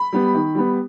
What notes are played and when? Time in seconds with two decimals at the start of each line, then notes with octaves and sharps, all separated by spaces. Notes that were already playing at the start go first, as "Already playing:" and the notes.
Already playing: B5
0.13 G3 B3
0.34 D#3
0.55 G3 B3